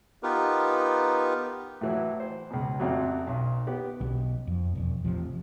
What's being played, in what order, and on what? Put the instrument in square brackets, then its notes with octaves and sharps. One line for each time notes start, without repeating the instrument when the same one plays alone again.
[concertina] B3 D#4 F4 G4 A#4 B4
[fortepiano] A2 E3 F#3
C5
C#2 B2
A1 F2 F#3
B1
B3 G4
[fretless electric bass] B1
F2
E1 E2
A1 C3 F3